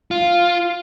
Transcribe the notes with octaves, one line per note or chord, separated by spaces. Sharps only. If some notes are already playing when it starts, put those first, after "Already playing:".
F4